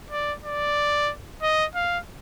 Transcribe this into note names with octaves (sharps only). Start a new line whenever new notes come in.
D5
D5
D#5
F5